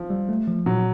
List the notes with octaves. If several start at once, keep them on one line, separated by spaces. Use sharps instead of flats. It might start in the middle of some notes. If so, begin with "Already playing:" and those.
Already playing: F3
G3
A3
F3
A#2 F#3